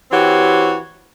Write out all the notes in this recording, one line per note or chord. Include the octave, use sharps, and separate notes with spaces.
E3 C4 F#4 G4 C#5